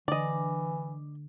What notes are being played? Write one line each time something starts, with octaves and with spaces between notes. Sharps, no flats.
D3 E3 D5 D#5